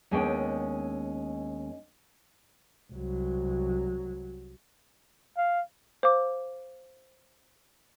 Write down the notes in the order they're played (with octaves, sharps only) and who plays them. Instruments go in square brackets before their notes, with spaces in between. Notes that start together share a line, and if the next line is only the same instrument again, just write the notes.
[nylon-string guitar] D#2 G#3 B3 C#4 D4 G5
[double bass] C2 F#3
[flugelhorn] F5
[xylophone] C5 F5 D6